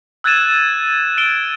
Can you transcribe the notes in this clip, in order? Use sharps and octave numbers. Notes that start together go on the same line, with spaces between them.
E6 F#6 G#6 A6 D#7 E7
F6 D7 G7